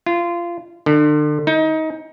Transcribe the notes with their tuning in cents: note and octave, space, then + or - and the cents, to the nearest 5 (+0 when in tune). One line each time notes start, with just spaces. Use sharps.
F4 -20
D3 +35
D#4 +25